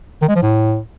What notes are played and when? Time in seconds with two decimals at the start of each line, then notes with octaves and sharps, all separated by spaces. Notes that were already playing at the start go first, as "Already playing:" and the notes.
0.22 D#3
0.29 G#3
0.36 F3
0.42 A2